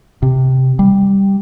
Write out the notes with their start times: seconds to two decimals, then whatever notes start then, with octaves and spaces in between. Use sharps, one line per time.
0.22 C3
0.79 G3